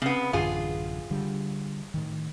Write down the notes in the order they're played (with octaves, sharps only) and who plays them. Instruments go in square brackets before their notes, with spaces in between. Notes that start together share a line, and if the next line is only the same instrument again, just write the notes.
[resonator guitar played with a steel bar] C#3 B3 [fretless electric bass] C4
[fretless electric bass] A1 F#2 D3 [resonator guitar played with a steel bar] F4 G#4
[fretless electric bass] D3 G3
A2 D#3